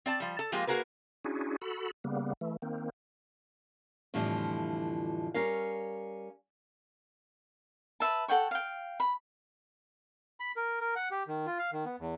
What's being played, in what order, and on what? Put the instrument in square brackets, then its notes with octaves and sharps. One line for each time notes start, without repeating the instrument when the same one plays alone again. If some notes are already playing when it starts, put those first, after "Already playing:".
[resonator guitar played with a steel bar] C4 D5 A5
F3 G3
A4 A5
F3 G#3 A#3 F4 G4
A#3 F#4 G#4 A#4 B4
[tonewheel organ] C#4 D4 E4 F#4 G#4
F#4 A4 B5
C#3 G3 A#3 B3
E3 A3
D#3 A#3 C4
[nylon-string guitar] F2 A2 D3 E3 F3 G3
G3 C#4 A#4 F5
[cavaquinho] B4 E5 A5
A4 F#5 G5 C#6
F5 G5
B5
[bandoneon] B5
A#4
A#4
F#5
G4
D#3
F4
F5
D#3
B3
E2